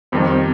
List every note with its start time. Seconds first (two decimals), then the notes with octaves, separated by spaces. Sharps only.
0.12 F2 D#3 G3 C4
0.27 C4